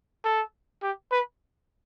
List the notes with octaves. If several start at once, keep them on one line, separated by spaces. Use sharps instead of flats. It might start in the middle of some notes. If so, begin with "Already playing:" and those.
A4
G4
B4